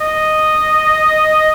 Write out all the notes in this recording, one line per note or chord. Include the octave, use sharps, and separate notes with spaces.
D#5